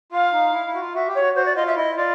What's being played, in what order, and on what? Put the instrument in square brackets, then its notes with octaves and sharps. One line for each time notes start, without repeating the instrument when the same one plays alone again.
[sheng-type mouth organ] F4 [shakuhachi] F5
[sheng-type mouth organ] D#4
E4
E4
F#4
F4
[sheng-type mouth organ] F#4 [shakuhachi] E5
[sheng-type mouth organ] G4
[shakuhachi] C#5
[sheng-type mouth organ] F#4
[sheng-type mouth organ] F#4 [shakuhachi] C5
[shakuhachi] D5
[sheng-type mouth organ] F4 [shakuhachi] D#5
[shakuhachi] E5
[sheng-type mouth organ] E4 [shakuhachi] D#5
[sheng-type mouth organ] F4 [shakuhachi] D5